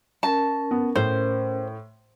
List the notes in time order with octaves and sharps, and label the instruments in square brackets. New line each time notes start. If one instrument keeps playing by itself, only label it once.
[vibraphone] C#4 A#4 [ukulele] A5
[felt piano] B3
[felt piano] A2 [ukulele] C5